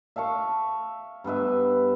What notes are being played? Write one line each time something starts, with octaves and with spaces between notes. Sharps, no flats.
E5 F5 A5 C#6
G2 B3 B4 E5